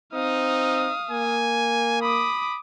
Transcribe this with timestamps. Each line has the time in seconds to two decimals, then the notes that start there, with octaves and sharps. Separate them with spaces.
0.14 C4 D#4 F5 D#6
1.11 A#3 G#5
2.02 B5 D6 D#6